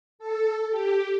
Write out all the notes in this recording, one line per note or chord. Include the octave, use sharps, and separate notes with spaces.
A4
G4